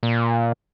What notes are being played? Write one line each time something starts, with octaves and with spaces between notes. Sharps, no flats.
A#2